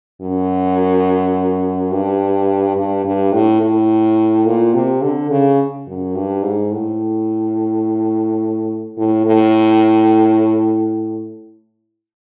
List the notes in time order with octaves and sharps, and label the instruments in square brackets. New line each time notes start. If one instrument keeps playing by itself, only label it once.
[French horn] F#2
G2
G2
G2
A2
A2
A#2
C3
D3
C#3
F#2
G2
G#2
A2
A2
A2